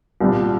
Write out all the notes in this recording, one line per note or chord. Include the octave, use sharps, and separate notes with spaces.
C2 A#2 G3